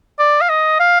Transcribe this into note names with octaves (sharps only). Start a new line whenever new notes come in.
D5
F5
D#5
F5